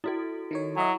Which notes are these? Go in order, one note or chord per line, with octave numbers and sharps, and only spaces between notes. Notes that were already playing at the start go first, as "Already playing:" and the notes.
E4 F#4 A4
D#3 D#4 C#5
F#3 D#5 E5 G#5